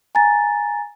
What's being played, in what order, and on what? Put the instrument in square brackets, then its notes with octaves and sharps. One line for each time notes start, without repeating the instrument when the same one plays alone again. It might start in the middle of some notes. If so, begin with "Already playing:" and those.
[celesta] G#5 A#5 A6